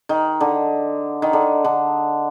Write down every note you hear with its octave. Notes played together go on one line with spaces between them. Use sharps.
D#3
D3
D#3
D3
D3